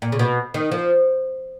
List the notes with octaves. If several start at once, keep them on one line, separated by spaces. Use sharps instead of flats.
A#2
C#3
B2
D#3
F3